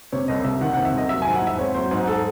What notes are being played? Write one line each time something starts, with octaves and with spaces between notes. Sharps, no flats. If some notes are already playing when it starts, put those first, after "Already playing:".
C3 C#5
C2 D#5
C2 E5
D#3 F#5
C3 F#5
E5
C2 D#5
F#3 E5
G#5
G#2
F#5
E4 E5
C4 C#5
F#3 C5
G#2
A4